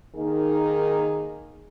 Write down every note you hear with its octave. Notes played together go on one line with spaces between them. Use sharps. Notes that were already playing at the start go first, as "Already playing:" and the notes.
D#3 A#3 D#4 G#4